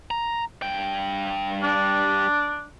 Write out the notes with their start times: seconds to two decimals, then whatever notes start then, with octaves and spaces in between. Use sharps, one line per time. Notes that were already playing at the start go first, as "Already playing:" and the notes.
0.11 A#5
0.62 G2 G5
1.63 D4